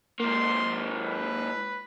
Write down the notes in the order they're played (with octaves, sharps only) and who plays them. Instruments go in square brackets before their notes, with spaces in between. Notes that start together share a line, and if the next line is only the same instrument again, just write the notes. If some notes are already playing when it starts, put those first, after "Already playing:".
[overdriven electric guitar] G#2 A#3 [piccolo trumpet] C6
[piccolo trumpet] B4